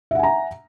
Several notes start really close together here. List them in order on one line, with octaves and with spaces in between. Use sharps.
E5 F#5 G#5 A#5